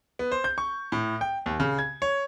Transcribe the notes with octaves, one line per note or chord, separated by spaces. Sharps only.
B3
C5
G6
C#6
A2
G5
D#2
C#3
G#6
C#5